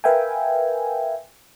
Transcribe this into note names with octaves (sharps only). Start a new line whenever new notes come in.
A#4 B4 E5 F5 G5 G#5